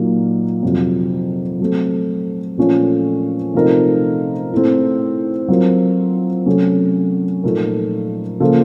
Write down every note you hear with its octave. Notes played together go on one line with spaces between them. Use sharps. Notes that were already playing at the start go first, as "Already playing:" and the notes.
Already playing: A#2 F#3 A#3 D#4
F2 C3 F#3
F#3 A3 C4
A#2 F3 A3 C#4 A4
C3 F3 A3 D#4 A#4
A2 A3 C4
F#3 C4 F4 A#4
C3 F#3 A3 C#4 A4
A#2 F3 A3 D#4 A#4
C#3 F3 A#3 F4 A4